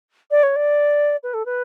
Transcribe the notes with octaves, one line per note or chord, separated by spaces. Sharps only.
D5
C#5
D5
B4
A4
B4